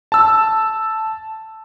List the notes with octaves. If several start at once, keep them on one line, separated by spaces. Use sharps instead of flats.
A5 E6